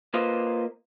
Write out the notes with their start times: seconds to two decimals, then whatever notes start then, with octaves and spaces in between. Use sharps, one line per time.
0.14 A#3 F4 B4 C5 D#5 F5